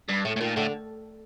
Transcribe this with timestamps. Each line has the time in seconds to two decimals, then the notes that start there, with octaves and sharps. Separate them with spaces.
0.09 G2
0.25 A2 A3
0.36 A2
0.41 A#2 D#3
0.56 A2 D3